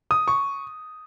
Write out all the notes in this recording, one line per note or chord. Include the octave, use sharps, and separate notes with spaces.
D#6
C#6